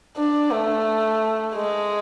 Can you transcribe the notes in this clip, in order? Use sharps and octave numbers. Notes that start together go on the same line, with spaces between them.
D4
A3
G#3